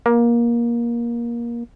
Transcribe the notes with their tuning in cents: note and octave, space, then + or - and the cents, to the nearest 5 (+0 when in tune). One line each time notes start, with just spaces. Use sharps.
A#3 +20